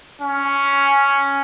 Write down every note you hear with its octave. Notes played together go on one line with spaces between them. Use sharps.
C#4